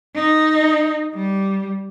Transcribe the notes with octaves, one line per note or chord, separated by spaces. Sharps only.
D#4
G3